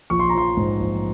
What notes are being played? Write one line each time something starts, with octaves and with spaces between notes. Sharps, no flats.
A#1 C#6
C6
A#5
F3 C6
G#2
A#1